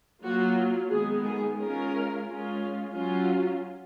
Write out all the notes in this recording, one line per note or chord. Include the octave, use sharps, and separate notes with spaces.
F#3 A#3 F4 F#4
D#3 G#3 B3 G#4
G#4
G#3 C#4 F4 A#4
G#3 C#4 F4
F#3 C#4 F4